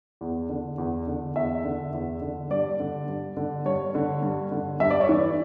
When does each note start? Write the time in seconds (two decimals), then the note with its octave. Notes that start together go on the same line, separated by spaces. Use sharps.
0.21 E2
0.49 D3
0.78 E2
1.07 D3
1.36 E2 E5
1.65 D3
1.93 E2
2.22 D3
2.50 G2 D5
2.80 D3
3.08 G2
3.37 D3
3.65 G2 C#5
3.95 D3
4.22 G2
4.52 D3
4.80 G2 E5
4.90 D5
5.01 C#5
5.09 E3 D5